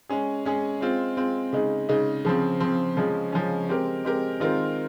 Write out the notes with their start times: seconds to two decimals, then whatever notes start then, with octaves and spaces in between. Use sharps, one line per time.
0.09 G#3 C#4 G#4
0.45 G#3 C#4 G#4
0.81 G#3 C4 F4
1.17 G#3 C4 F4
1.53 C#3 G#3 D#4
1.89 C#3 G#3 D#4
2.25 C#3 F3 C4
2.60 C#3 F3 C4
2.97 C#3 F3 G#3 C#4
3.32 C#3 F3 G#3 C#4
3.68 G#3 C4 G4 A#4
4.05 G#3 C4 G4 A#4
4.40 D#3 G#3 C4 F4 A#4